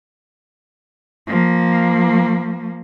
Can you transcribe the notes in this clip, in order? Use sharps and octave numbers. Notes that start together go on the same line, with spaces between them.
F3 A#3